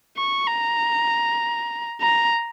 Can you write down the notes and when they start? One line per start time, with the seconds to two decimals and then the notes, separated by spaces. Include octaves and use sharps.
0.17 C#6
0.48 A#5
2.01 A#5